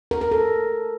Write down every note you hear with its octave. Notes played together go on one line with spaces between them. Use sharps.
A#4
A#4
A4